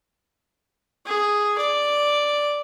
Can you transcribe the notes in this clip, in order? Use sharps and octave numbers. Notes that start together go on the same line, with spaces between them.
G#4
D5